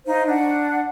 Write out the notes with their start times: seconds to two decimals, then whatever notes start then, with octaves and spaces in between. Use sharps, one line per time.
0.07 D#4 C5 F5
0.27 D4 F#5